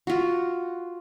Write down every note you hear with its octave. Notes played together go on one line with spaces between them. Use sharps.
F4 F#4